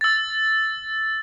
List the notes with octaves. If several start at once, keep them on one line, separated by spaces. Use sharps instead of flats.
E6 A6